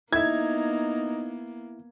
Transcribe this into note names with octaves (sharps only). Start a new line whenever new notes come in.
A#3 B3 D#4 E4 E5 G#6